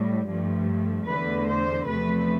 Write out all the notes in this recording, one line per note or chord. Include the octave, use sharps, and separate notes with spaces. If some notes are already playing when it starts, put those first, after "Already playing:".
Already playing: A2 G3
G2 F3 A3
E2 D3 A3 B4
C5
E2 C3 F3 A3 B4